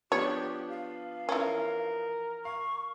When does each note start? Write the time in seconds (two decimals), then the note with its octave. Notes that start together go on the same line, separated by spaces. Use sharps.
0.12 F3 B3 D4 G4 C#5
0.69 F5
1.29 E3 C#4 A#4
2.45 F5 C#6